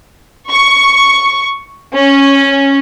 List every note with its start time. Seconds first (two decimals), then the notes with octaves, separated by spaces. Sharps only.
0.49 C#6
1.94 C#4